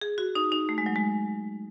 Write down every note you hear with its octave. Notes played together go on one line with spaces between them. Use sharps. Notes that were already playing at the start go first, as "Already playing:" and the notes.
G#4
F#4
D#4
D#4
A3
G#3
F#3
G#3